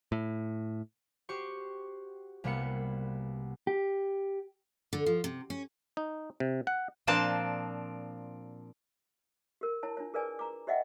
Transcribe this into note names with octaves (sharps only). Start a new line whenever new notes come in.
A2
F#4 G4 C5 C#6
C2 C3 A#3 B3 F#5 C#7
G4
D3
F3
C3
C#4
D#4
C3
F#5
A#2 F3 C4 D4 A5
G4 A#4
E4 C#5 A5
D4 F4 C#5
G#4 A#4 B4 D5 G#5
A#5 D6
G4 C#5 D#5 E5 F#5 G5